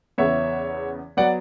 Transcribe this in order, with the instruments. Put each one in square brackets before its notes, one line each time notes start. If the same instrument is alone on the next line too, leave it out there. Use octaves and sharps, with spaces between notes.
[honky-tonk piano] E2 C#3 E3 B3 [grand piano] C#5 E5
[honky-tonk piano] F#3 B3 [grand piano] D5 F#5